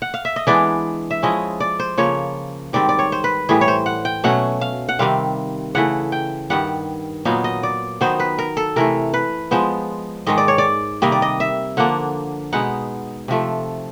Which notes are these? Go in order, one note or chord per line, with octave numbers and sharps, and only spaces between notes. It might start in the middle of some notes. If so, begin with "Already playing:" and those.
F#5
F5
E5
D#5
E3 G#3 B3 D4 D5
E5
F3 G#3 C#4 E4 D#5
D5
C5
C#3 F3 A#3 C#5
G#2 D#3 G3 C4 D5
D5
C#5
C5
B4
A2 E3 G3 G#4
C#5
C5
F#5
G5
B2 F#3 A3 C#4 F#5
F5
F#5
C3 D#3 G3 C4 F5
C#3 E3 A3 F#5
G5
G2 D#3 G3 F#5
A#2 F#3 B3 D#4 F5
D#5
D5
D#3 F#3 B3 D#4 C5
B4
A#4
A4
C3 E3 A3 A#4
B4
F3 G#3 B3 C5
G#2 D#3 G#3 D#5
D5
C#5
D5
C3 D#3 G3 A#3 D#5
D5
D#5
E5
D3 F3 A#3 D4 F#5
B2 G#3 B3 D#4 F#5
C3 F3 A3